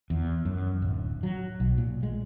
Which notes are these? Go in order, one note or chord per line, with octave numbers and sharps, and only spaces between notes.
E2
F#2
D1
F#3
B1
A#2
G#3